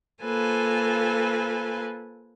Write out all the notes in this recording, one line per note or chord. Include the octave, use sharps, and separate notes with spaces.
A#3 F4 A4 B4 C5 G#5